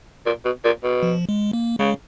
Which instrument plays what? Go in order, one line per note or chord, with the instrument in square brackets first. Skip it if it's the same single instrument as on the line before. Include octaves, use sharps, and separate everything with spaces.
[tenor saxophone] A#2
B2
A#2
B2
[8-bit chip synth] F3
G#3
A#3
[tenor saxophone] C#3 [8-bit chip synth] G#3